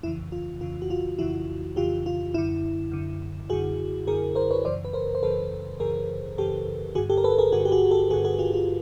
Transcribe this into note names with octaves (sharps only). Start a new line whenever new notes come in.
F2 C#3 E3 E4
F4
F2 C#3 E3 F4
F#4
F4
F2 C#3 E3 E4 F#4
F2 C#3 E3 F4 G4
F4
F#2 D3 E4
F#2 D3
F#2 D3 F#4 G#4
F#2 D3 G#4 A#4
A#4 C5
B4 C#5
F#2 C#3 E3 C5 D5
B4
A#4 C5
C5
F#2 C#3 E3 A4 B4
F#2 C#3 E3 G#4 A#4
F#2 C#3 E3 G4 A4
G2 D3 F#4 G#4
G4 A4
A#4
A4 B4
G#4 A#4
G2 D3 F#4 G#4
G4
F#4 G#4
G4 A4
G2 D3 F#4 G#4
F#4 G#4
F4 G4
F4